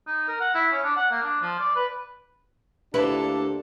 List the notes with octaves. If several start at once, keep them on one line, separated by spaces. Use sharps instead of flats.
D#4
A#4
F#5
E4
C#4
D4
F#5
A#3
D4
F3
D5
B4
D2 A#2 A#3 D4 E4 G4 A4 B4